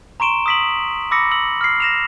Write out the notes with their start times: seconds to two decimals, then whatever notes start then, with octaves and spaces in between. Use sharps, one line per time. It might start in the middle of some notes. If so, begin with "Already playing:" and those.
0.20 A#5 C6 C#6 D7 E7 G7
0.46 D#6 E6 B6 D7 F#7
1.11 B5 D6 E6 A#6 C#7
1.31 E6 F#7
1.61 F6 C7
1.80 A#6 E7 F7